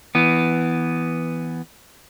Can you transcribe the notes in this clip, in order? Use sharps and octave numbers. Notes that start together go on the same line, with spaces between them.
E3 B3